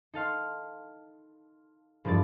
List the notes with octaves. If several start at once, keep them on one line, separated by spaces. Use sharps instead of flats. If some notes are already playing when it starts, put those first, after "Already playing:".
D#4 A4 F5 C6
E1 G2 F3 D5 A6